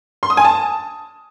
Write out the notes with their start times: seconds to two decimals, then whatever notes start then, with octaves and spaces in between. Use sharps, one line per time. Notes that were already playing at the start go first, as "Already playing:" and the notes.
0.23 C6
0.30 D#6
0.37 G#5
0.45 A5